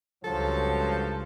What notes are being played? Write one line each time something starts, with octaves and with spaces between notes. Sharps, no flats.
C#2 G2 F3 F#3 A4